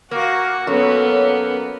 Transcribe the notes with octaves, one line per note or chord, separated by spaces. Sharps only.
A#3 F#4
F#2 A#3 B3 A4